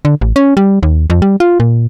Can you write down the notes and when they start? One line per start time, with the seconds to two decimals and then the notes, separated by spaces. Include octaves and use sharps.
0.05 D3
0.21 A1
0.36 C#4
0.57 G3
0.83 D#2
1.10 F2
1.22 G3
1.40 F4
1.60 A#2